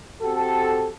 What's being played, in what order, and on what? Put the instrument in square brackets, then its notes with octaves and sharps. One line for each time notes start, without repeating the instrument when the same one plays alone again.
[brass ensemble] C4 F#4 G4 A4